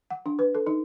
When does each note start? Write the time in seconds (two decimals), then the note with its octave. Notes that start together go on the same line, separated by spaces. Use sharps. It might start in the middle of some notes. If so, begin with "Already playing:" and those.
0.10 F#5
0.26 D4
0.39 B4
0.55 A4
0.67 D#4